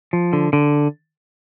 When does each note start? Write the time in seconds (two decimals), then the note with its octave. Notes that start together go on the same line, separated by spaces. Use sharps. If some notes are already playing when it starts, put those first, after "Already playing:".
0.13 F3
0.33 D3
0.53 D3